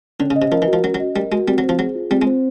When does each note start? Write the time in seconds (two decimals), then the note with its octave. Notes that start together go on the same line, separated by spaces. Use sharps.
0.20 D3 C#4
0.30 C#3
0.36 D#5
0.42 C3
0.52 F3 A#4
0.62 E3
0.68 F#4
0.73 F3
0.83 F#3 C#4
0.94 F#3
1.00 D#5
1.16 G3 A#4
1.32 G#3 F#4
1.47 G3 C4
1.58 F#3
1.63 C5
1.69 F3
1.79 F#3 G#4
1.95 F4
2.11 G3 C4
2.22 G#3
2.27 C5